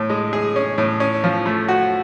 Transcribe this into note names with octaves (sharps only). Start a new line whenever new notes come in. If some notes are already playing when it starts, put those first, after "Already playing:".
Already playing: A2
G#3
G#4
C#4
A2
C#4
F3
A3
F#4